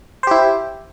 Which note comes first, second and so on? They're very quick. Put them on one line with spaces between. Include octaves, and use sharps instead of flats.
C5 G4 E4